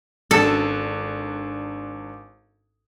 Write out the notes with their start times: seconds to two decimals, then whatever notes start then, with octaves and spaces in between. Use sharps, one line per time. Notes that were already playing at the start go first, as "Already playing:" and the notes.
0.31 G#1 D4 A4